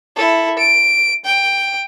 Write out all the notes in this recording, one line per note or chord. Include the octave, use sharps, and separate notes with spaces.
E4 A4
D7
G5